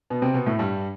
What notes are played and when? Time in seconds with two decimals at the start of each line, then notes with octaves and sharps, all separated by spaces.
0.10 B2 B3
0.22 C3 C4
0.34 B2 B3
0.46 A2 A3
0.59 G2 G3